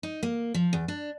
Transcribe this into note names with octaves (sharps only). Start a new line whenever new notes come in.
D#4
A#3
F3
E2
D4